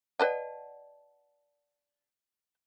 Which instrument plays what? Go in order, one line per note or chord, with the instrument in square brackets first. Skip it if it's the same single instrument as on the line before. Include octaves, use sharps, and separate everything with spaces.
[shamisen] B4 D#5 G5 [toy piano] D5 F#5 A5